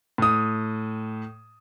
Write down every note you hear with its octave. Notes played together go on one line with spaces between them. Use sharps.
A2 D#6